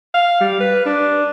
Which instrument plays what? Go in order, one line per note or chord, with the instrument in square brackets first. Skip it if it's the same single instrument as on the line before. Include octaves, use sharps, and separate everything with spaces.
[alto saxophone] F5
G3
B4
D4